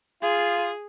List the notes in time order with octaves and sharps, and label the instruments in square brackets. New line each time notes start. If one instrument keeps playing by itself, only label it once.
[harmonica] F4 [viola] G#4